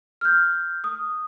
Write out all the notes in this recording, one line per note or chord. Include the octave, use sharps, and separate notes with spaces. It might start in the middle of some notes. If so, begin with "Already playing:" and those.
F6 G6
D#6